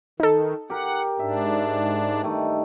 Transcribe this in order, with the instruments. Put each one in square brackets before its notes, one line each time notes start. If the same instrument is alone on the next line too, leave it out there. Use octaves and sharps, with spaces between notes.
[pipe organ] D#3 [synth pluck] D#4 A4
[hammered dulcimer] G4 A#4 [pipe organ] F#5
[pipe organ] G#2 D4 [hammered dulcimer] E5
[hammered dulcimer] G2 D#3 A3